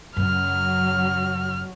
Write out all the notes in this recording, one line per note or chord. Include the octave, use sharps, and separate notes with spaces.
F#2 C#3 F#3 F6